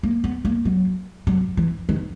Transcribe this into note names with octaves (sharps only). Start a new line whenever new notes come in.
A#3
B3
A#3
F#3
F#3
E3
D#3